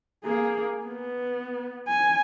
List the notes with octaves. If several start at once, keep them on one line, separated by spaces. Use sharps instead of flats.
A#3 G#4
B3
G#5